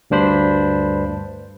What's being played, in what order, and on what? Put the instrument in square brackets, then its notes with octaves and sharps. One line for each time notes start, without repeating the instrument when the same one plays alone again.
[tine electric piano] D2 G2 D4 C5 B5